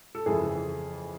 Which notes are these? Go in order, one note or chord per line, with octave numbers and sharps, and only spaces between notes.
A4
F2 C#3 E3 G#4